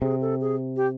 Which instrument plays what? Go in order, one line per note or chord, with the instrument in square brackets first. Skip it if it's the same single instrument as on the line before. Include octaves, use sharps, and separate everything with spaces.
[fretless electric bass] C3 [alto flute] G#4
[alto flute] A4
G#4
G4